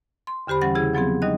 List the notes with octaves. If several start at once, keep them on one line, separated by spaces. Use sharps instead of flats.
C6
E2 D3 G4 C5 B5
E3 G3 C#4 F#5 A6
C#3 E4 G#4
F3 F#3 B3 C4 G#4
G3 D#4 D#5 F#6